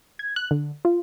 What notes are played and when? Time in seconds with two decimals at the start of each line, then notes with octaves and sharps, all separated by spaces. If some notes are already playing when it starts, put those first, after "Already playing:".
0.19 G#6
0.36 F#6
0.51 D3
0.85 F4